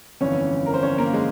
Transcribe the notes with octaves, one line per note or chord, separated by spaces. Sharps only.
G1 F2 E3 C#4 C#5
A#4
C5
C#4 C#5
A#3 A#4
G#3 G#4